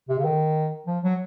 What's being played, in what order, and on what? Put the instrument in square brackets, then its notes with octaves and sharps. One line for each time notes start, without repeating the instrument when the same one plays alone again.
[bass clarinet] C3
C#3
D#3
F3
F#3